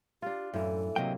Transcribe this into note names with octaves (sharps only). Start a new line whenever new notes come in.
D4 F4 G4
F#2 A2 E3 A4
C3 F#3 A#3 D#5 G5